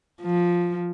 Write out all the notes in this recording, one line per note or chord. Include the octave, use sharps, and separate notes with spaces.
F3